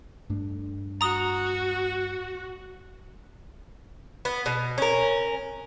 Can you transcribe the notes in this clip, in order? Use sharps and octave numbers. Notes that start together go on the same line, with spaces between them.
G2 A3 D4
F#4 A#5 D#6
B3
B2
C#4 A#4